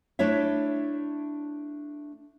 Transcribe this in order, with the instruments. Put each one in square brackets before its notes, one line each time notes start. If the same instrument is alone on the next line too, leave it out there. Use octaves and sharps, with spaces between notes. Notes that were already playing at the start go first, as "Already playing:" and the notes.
[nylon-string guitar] A3 D4 E4 C#5 E5